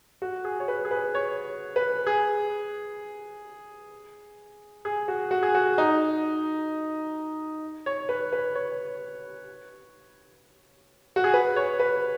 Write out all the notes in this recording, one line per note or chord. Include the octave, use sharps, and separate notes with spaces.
F#4
G#4
C#5
B4
G#4
B4
C#5
B4
G#4
G#4
F#4
F#4
G#4
F#4
D#4
C#5
B4
B4
C#5
F#4
G#4
B4
C#5
B4